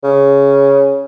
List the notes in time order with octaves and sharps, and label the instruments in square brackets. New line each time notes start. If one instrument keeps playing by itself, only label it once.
[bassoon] C#3